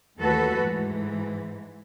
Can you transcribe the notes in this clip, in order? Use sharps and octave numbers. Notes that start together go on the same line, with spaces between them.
D#2 E3 A3 F#4 A4 B4
G#2 E3